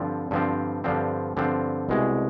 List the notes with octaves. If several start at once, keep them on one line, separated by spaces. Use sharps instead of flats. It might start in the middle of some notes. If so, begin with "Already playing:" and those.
Already playing: G2 D3 F3 C4
G2 D3 F3 C4
G2 D3 F3 C4
G2 D3 F3 C4
C2 B2 G#3